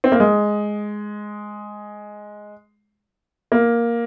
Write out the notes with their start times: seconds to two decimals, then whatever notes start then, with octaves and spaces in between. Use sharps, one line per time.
0.04 C4
0.12 A#3
0.20 G#3
3.52 A#3